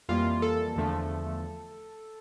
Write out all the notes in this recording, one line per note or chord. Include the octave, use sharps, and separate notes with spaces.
F2 E3 G3 A#3 F4
A4
E2 D3 F3 A3